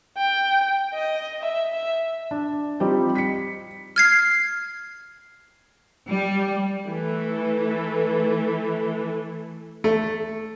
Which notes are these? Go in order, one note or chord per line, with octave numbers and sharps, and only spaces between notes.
G5
D#5
E5
E5
D4
F3 G3 C4 D#4 G4
B6 C#7
F6 G#6 C7
G3
E3 A3 A4
A3